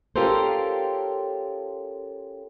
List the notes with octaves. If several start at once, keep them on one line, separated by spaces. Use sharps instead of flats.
C#4 F4 G4 A4 A#4 C5